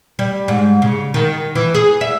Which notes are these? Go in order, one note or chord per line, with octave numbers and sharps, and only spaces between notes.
G3
G#2
C#3
D#3
E3
G#4
E5